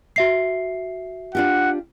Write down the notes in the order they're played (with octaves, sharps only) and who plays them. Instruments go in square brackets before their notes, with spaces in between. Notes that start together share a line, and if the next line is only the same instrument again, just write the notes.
[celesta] F#4 E5 C7
[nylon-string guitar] D4 F4 G4 [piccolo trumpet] F#5